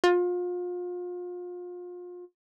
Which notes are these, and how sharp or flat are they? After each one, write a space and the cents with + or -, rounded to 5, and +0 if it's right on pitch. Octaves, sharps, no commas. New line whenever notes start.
F4 +35